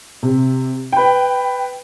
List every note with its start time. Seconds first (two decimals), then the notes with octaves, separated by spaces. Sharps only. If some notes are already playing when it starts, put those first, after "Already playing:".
0.23 C3
0.92 B4 G5